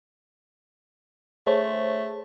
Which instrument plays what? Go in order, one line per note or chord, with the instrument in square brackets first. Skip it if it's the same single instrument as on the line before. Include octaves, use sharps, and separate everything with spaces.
[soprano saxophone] A3 [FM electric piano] G#4 C5 C#5